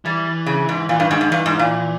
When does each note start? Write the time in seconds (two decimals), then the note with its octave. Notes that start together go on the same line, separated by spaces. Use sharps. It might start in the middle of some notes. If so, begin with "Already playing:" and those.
0.05 E3 G3
0.46 C#3
0.69 G#2
0.89 A#2 E3
1.00 G2
1.10 G#2 D#3
1.21 G#2
1.31 G2 E3
1.46 G#2
1.59 A#2